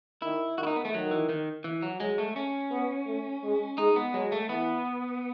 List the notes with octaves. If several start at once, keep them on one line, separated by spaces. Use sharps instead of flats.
D#3 E4
D#3 F#4
E4
D#4
B3
A3
D#3 F#3
E3
D#3
E3
F#3
F#3 G#3
A3
C#4
B3
A3
G#3
G#3 D#4
B3
F#3 G#3
A3
E3 B3